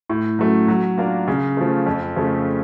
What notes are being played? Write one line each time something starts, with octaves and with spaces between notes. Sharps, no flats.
A2
F#3 A3 C#4
F#3
A#3 D4 F4 A#4
C#3
F3 A3
F2
C#3 F3 A3